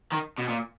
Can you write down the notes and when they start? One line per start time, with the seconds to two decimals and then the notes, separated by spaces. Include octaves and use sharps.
0.12 D#3
0.38 B2
0.48 A#2